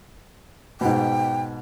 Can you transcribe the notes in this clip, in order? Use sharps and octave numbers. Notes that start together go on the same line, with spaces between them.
G#2 B2 G5